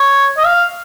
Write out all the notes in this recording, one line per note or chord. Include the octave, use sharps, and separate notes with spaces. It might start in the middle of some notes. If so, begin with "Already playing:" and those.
Already playing: C#5
D#5
F5